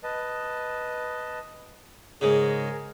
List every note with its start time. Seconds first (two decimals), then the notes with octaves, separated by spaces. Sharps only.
0.03 B4 D#5 A5
2.21 G#2 C#3 G#4 A#4